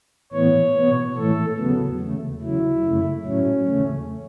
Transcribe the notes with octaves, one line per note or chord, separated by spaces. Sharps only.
A2 E3 B3 C#5
B2 B3
A2 E3 A3 A4
E2 C#3 F#3 B3
E2 C#3 A3
E2 C#3 F#3 E4
F#2 C#3 A3
A2 F#3 A3 C#4
E2 C#3 A3